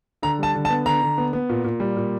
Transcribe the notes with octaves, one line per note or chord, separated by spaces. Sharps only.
D3 A#5
G3 A5
D3
A5
B3
D3 A#5
D3
B3
B3
A#2
A#2
G3
A#2